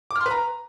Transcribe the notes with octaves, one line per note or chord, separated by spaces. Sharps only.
D6
F6
C6
B4
A#5